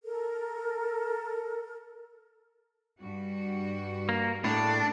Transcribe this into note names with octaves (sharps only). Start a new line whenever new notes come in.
A4 A#4
G2 G3 F#4
A#3
A2 A#3 D4 G#4 A4